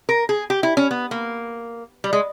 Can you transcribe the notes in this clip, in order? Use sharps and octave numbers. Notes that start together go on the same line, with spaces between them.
A#4
G#4
G4
E4
C#4
B3
A#3
G3
G#3